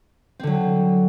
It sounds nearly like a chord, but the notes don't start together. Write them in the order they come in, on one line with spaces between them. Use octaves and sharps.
C4 D3 F#3